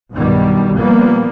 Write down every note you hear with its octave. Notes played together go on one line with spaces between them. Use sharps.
B1 G2 B2 D#3 G3
A#2 E3 F3 G3 A#3 B3